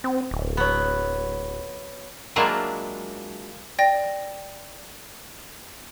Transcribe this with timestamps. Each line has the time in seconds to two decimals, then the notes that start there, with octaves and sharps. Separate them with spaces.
0.04 C4
0.31 D1
0.57 F#3 B3
2.36 F#3 G#3 A#3 D4 E4 F4
3.79 D5 G5 A#6